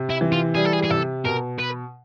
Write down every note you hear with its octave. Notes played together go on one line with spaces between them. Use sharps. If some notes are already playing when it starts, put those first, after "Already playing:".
Already playing: C3
E4
E3
F4
G3 G#4
A4
G#4
G#4
C3 A4
B2 A#4
B4